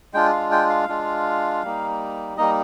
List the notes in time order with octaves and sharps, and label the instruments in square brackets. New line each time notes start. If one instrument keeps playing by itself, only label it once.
[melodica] G#3 D4 F4 G5
F5
G5
F5
G#3 D4 F4
G3 A#3 D#4
G3 A#3 D#4 D#5